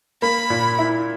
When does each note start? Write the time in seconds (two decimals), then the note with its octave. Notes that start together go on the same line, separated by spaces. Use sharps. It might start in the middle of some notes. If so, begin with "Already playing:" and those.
0.22 A#3 B5
0.50 A#2
0.79 E4